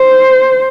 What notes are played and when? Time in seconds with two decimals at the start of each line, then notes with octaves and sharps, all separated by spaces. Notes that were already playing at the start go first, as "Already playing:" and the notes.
Already playing: C5